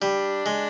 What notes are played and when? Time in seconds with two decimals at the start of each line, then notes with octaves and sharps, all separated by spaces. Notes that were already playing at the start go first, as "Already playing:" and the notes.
0.02 G3 D4
0.46 G#3